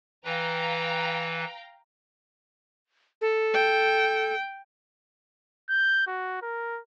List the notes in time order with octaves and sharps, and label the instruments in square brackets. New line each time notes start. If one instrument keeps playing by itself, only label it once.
[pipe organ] E3 B4 [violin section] F5 G5 A#5
[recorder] A4
[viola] G5
[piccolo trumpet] G6
F#4
A#4